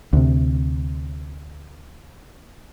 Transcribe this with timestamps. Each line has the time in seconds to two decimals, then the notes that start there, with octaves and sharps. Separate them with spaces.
0.13 D2 C3